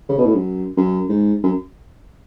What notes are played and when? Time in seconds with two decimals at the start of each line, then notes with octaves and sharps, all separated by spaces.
0.09 C#3
0.18 B2
0.26 A2
0.35 F#2
0.77 F#2
1.09 G#2
1.43 F#2